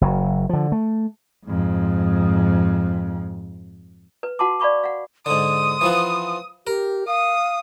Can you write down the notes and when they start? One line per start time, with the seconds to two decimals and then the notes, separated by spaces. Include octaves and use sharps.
0.01 F#1 F#3
0.49 D3 F3
0.72 A3
1.45 F2 G#2
4.23 B4
4.39 F#4 F#5 A5 C6 D6
4.60 D5 F5 B5 C#6 D6
4.84 F5 F#5
5.26 G#2 D3 C6 D#6
5.81 E3 F3 B3
6.67 G4 A#4
7.07 F5 D#6